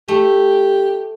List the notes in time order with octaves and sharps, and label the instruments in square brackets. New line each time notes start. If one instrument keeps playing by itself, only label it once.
[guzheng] A3 [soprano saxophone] G4